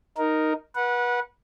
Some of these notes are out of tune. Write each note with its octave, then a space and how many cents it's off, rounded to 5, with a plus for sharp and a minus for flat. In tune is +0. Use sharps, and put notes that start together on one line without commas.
D#4 +0 A#4 +0
B4 -30 F#5 -15